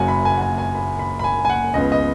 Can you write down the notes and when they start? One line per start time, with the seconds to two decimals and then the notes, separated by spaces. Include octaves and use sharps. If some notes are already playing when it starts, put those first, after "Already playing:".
Already playing: F#1 F#2 F#3 F#5 G#5
0.08 B5
0.25 G#5
0.37 F#5
0.41 G#5
0.58 G#5
0.75 B5
0.99 B5
1.19 B5
1.24 G#5
1.45 G#5
1.50 F#5
1.74 C#2 C#3 B3 D#5
1.92 D#5